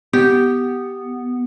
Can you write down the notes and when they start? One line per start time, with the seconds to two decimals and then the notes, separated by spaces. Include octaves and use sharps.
0.13 B3 G4